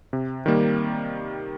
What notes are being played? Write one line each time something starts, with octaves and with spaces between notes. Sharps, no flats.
C3
D#3 G3 A#3